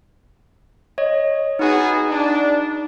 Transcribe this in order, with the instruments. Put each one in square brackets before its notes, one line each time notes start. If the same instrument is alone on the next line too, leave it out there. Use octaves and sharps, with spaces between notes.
[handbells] C#5 D#5
[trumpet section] B3 F#4 G#4 [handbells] D#4
[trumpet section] D4